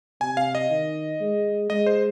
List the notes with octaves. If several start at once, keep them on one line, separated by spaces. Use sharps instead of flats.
C3 G#5
F5
D#5
D#3
G#3
G#3 D#5
C5